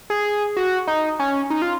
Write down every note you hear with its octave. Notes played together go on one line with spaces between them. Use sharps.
G#4
F#4
D#4
C#4
D#4
F4